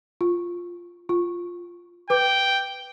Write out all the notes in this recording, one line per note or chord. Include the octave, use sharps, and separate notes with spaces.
F4
F4
B4 G5 D6